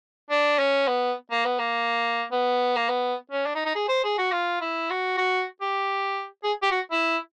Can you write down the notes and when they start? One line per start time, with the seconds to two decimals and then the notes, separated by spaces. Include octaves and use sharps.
0.30 D4
0.59 C#4
0.87 B3
1.31 A#3
1.45 B3
1.60 A#3
2.32 B3
2.77 A#3
2.89 B3
3.31 C#4
3.46 D4
3.55 D#4
3.66 D#4
3.76 G#4
3.89 C5
4.04 G#4
4.19 F#4
4.32 F4
4.61 E4
4.90 F#4
5.18 F#4
5.61 G4
6.44 G#4
6.63 G4
6.71 F#4
6.92 E4